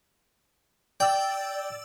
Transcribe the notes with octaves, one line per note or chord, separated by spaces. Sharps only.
D5 G5 E6 A6